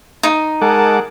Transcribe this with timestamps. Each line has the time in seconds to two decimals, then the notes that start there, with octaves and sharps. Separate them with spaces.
0.23 D#4
0.62 G#3 A#4 F#5 A5 D6